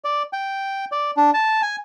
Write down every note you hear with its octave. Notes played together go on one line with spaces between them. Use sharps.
D5
G5
D5
D4
A5
G#5